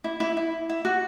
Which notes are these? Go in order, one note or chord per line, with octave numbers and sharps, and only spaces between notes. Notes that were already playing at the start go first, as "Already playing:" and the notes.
E4
E4
E4
E4
F#4